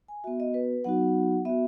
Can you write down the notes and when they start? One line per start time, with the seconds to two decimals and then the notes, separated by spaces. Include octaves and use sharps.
0.08 G#5
0.24 B3 F#4 E5
0.40 D#5
0.54 B4
0.84 F#3 B3 D#4 F#4 F#5
1.45 B3 F#4 E5